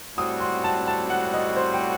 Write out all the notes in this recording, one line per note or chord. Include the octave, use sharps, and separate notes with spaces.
A2 G3 C4 F#4 D#6
C6
A5
A5
F#5
D#5
C5
G5